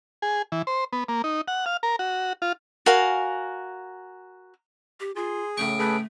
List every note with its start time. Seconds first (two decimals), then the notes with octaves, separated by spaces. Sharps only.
0.22 G#4
0.52 E3
0.67 C5
0.93 B3
1.08 A#3
1.24 D#4
1.48 F#5
1.66 F5
1.83 A#4
1.99 F#4
2.42 F4
2.86 F#4 A#4 F5 G#5
5.00 G4
5.16 F4 G#4 C6
5.58 A2 C#3 A3 C#6 D7
5.79 A3 G#4 A4 B4